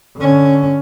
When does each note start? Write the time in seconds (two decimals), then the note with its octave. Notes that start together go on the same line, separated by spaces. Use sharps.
0.17 D3 C#4